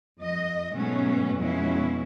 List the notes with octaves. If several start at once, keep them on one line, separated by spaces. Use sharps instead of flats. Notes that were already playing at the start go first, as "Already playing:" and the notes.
F2 D#5
G#2 B2 F#3 A3 B3 C#4
F2 B2 G#3 C#4 E4